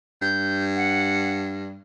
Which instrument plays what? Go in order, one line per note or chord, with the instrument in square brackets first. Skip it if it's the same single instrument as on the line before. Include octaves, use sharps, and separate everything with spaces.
[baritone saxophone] G2 [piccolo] G6
[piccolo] F#5